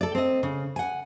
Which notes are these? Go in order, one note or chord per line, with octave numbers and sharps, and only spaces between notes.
A4 D5
C4 D#5
C#3
F#5 G#5